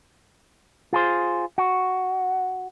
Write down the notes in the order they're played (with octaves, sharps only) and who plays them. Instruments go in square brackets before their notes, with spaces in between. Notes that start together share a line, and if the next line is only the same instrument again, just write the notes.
[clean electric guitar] F4 G#4 C5
F#4